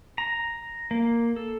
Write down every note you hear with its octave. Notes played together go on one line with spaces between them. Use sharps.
A#5
A#3
A4